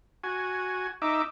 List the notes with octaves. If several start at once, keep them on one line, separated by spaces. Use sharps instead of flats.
F#4 G#5
D#4 E5 D6